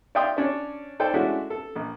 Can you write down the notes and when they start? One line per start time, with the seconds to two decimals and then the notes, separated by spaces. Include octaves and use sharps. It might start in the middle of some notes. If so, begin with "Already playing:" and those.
0.15 D5 E5 F5 G5 C6 D#6
0.37 C#4 D4 C#5
1.00 D#4 A4 C5 D5 G5
1.14 G#3 A3 C#4 D4 E4 F#4
1.50 A4
1.75 A#1